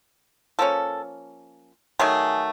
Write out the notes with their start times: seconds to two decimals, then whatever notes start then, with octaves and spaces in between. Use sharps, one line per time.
0.59 F3 A#3 C#4 A4
1.99 D#3 F#3 A3 G#4